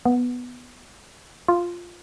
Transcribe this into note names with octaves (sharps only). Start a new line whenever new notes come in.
B3
F4